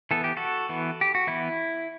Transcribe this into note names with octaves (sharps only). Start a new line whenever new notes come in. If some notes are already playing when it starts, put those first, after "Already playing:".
E3 B3 A4
G4
F#4 A4
E3 B3
G4
F#4
E3 B3 E4